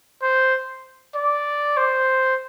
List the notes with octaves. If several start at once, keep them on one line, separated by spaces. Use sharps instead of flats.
C5
D5
C5